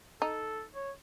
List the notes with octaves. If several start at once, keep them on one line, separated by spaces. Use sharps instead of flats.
D#4 A4
C#5